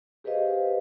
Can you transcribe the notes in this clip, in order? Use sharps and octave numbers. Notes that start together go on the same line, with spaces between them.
G4 G#4 B4 C5 D#5 F5